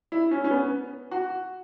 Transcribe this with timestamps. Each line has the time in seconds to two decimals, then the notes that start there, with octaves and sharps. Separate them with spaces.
0.12 E4
0.31 C#4
0.44 C#4
0.51 B3
1.11 F#4